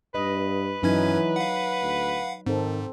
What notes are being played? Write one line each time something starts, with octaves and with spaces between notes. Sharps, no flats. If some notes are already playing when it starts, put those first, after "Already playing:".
G2 B4 D#5
G2 E3 F#3 C#4 D#4 G#6
F5 F#5
D2
G#2 D#3 C4 A4